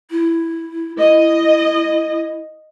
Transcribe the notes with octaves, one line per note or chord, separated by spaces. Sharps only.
E4
E4 D#5